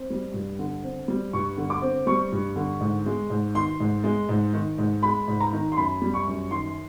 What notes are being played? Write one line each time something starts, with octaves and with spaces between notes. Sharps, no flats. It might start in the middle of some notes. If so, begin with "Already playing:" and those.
Already playing: C4
G3
G2
D3
C4
G3
G2 C#6
D3
D6
C4
G3 C#6
G2
D3
G#2
G#3
G#2
D#3 C6
G#2
G#3
G#2
D#3
G#2
G#3 B5
G#2
A#5
D#3
C6
F#2 B5
G3
C#6
F#2
D#3 C6